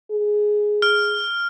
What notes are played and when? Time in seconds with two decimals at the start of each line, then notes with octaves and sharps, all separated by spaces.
0.12 G#4
0.82 F6